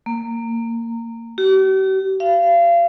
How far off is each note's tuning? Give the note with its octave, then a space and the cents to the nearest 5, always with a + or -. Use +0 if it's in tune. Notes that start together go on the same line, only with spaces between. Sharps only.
A#3 -20
G4 -45
F5 -30